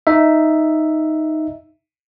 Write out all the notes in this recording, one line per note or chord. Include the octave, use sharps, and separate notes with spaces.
D#4 E5